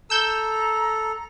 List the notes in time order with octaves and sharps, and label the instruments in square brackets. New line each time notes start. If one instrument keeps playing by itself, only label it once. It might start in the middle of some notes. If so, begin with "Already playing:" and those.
[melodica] A4 [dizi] A#5 [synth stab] E6 G6